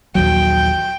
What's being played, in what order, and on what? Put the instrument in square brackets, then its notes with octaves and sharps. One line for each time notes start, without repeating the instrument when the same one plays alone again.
[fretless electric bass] A#1 D#2 F#3 [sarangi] G5